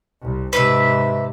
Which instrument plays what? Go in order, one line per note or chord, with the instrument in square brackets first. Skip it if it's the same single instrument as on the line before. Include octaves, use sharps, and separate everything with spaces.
[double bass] C2
[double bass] G#2 C3 [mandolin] B4 D5 E5